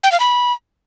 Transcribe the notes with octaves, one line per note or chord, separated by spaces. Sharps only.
G5
F5
B5